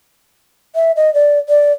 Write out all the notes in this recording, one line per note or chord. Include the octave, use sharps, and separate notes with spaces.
E5
D#5
D5
D5